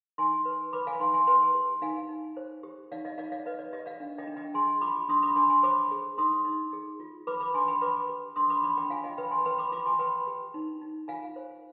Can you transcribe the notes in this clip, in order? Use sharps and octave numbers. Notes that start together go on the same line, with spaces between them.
D#4 G#5 C6
B4
B4 B5 D6
F5 G#5
D#4 G#5 C6
G#5 C6
B4 G#5 C6
G4
D#4 F5 G#5
D#4
C5
G4
D#4 D5 F5
D#5
D#4 D5 F5
D5 F5
B4 D#5
D5
G4 D#5
D5 F5
D4
D#5 G5
D4
D#5 G5
G#4 G#5 C6
F4 B5 D6
D4 C6 D#6
B5 D6
D4 G#5 C6
G#5 C6
C5 B5 D6
G#4
D#4 C6 D#6
D#4
G#4
F4
B4 B5 D6
B5 D6
D4 G#5 C6
G5 B5
B4 B5 D6
G4
D4 C6 D#6
B5 D6
D4 B5 D6
G5 B5
F4 F5 G#5
D#5 G5
B4 G5 B5
G#5 C6
B4 G5 B5
B5 D6
F4 B5 D6
G#5 C6
B4 G5 B5
G4
D#4
D#4
F4 F5 G#5
C5